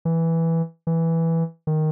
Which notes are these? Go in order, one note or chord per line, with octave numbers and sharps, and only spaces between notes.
E3
E3
D#3